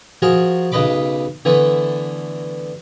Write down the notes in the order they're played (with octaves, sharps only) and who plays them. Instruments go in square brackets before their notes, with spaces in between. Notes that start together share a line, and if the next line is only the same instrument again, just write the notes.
[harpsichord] F3 F#4 G#4 A#4
B1 C#3 B4 D#5 B5 D6
D3 E3 A3 B3